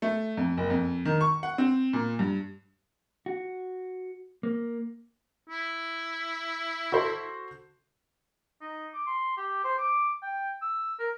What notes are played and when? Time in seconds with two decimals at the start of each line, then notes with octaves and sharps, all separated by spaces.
0.02 A3
0.37 F2
0.57 F#1
0.70 F2
1.05 D#3
1.21 C#6
1.43 F#5
1.58 C4
1.93 A#2
2.19 G2
3.26 F#4
4.43 A#3
5.49 E4
6.92 F#4 A4 C5
8.61 D#4
8.94 D6
9.07 C6
9.37 G4
9.64 C5
9.78 D6
10.22 G5
10.62 E6
10.99 A#4